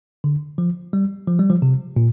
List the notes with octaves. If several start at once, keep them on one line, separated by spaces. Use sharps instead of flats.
D3
F3
G3
F3
G3
F3
C3
A#2